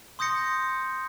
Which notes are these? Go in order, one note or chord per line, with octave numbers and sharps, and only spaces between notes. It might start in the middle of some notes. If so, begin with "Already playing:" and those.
C6 D#6 G6 A#6 C#7